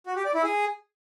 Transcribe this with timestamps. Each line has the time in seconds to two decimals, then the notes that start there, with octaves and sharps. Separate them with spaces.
0.06 F#4
0.16 G4
0.25 D5
0.34 E4
0.44 G#4